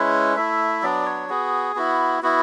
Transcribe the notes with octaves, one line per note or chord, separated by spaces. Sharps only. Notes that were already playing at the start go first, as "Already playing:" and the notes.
Already playing: G#3 C#4 E4 B4
A3 E4 E5
F#3 B3 D4 D5
C#5
B3 F#4 G#4
B3 E4 F#4
B3 E4 F#4